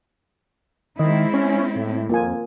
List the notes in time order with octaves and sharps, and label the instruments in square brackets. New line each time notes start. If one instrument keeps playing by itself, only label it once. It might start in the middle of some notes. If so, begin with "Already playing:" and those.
[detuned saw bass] D#3 [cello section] G#3 C4 E4 [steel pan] D#5
[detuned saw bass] C#4 [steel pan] C#5
[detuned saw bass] A2
[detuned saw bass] F2 [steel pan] A#3 F4 G#5